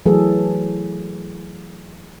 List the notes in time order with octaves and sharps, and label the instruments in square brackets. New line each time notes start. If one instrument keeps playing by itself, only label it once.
[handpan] E3 F#3 A3 G#4 A4